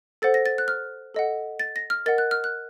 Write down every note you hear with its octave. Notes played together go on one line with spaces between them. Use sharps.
A4 C5 F#5 A6
A#6
A6
F#6
F6
A4 D#5 F#5
A6
A#6
F6
A#4 D#5 F#5 A6
F#6
F6
F#6